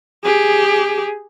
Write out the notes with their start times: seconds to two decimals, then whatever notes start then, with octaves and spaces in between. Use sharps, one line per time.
0.24 G4 G#4